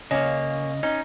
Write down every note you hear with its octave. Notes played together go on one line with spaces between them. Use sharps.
C#3 A#3 C#4 D#5
C#4 D#4